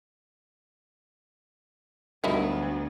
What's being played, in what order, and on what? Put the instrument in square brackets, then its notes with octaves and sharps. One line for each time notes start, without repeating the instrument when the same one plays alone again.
[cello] D2 B3 [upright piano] G2 B2 F#3 [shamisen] D#4 E4 A#4